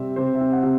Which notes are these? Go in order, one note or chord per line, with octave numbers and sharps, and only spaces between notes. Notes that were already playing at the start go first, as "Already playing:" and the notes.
Already playing: C3 G3 C4 E5
C3 C5
E5
C4
F#5
C3